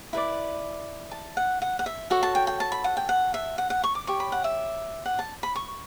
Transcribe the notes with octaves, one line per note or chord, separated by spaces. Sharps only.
E4 B4 D5
A5
F#5
F#5
F#5
E5
F#4 A4 C#5 F#5
A5
G5
G5
A5
B5
F#5
G5
F#5
E5
F#5
F#5
C#6
D6
G4 C#5 C#6
B5
F#5
E5
F#5
A5
B5
C#6